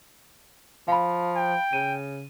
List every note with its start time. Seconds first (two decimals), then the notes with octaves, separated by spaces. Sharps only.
0.88 F3 F5 B5
1.36 G5
1.73 C#3 D#7